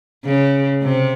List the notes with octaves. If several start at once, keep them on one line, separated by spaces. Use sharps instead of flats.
C#3
C3